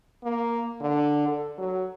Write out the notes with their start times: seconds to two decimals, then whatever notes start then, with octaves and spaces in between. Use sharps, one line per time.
0.23 A#3
0.81 D3
1.28 A4
1.58 F#3